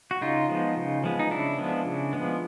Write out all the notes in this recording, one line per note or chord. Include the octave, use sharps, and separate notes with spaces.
F#4
C#3 D#4 F4
F3 G#3 B3
C#3
F3 G#3 B3
D#4
C#3 D4 E4
F3 G#3 B3
C#3
F3 G#3 B3